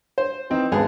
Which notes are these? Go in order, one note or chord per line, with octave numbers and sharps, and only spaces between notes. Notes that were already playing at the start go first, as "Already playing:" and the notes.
C5
E3 C4 D#4
G#1 G#3 B3 G#4 A5